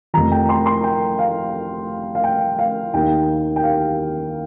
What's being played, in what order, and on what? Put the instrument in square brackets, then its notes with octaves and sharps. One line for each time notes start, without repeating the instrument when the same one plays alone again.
[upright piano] F1 F2 C3 F3 A#5
G5
C6
C6
G5
F5
F5
G5
F5
D#2 D#3 A#3 D#4 G5
G5
F5